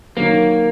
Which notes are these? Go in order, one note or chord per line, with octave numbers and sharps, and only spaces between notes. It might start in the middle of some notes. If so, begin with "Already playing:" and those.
D#3 F#3 A#3